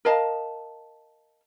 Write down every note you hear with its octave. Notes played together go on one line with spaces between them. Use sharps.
A#4 D#5 F5 A5